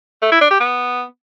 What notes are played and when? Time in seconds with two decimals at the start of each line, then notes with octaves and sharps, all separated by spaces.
0.22 A3
0.32 E4
0.41 D4
0.51 G4
0.60 B3